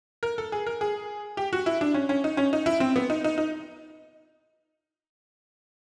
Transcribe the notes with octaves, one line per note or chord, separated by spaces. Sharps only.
A#4
A4
G#4
A#4
G#4
G4
F#4
E4
D4
C#4
C#4
D#4
C#4
D#4
E4
C4
B3
D#4
D#4
D#4